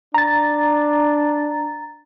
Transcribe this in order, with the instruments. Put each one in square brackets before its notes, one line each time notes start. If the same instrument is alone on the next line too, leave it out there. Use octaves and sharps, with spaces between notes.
[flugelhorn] D4 [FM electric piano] A#5 A6